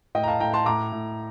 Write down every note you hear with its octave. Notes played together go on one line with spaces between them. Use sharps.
A2 D#5 G5
A#5
F5 A5
A2 G5 A#5
A5 C6
A2 A#5 D6
A2